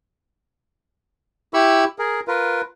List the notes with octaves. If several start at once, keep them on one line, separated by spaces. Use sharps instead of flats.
E4 G4 B5 C#6 E6
G#4 A#4
F4 A#4 B4